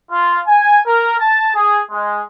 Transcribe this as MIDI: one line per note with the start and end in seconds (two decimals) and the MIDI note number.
0.10 0.39 65
0.45 0.78 80
0.84 1.16 70
1.18 1.48 81
1.54 1.80 68
1.90 2.21 56